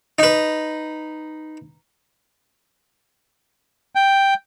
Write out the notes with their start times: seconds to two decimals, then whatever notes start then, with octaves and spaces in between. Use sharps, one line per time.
0.19 D#4 B4
3.95 G5